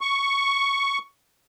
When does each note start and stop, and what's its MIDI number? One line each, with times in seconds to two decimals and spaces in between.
0.01 0.98 85